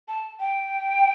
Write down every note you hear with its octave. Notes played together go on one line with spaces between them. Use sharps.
A5
G5